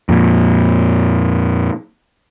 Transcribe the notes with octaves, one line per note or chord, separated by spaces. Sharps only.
F2 A#2